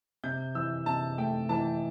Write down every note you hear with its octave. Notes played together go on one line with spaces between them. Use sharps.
C3 G6
E3 E6
C3 A5
A3 G5
E3 A5